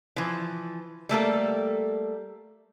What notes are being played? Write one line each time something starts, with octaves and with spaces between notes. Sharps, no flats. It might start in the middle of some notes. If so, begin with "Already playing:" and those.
E3 F3
G3 A3 A#3 A4